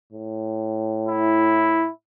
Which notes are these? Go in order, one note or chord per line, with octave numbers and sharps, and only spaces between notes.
A2
E4